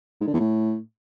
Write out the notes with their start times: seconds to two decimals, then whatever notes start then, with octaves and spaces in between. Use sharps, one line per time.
0.21 G#2
0.27 D3
0.33 E2
0.40 A2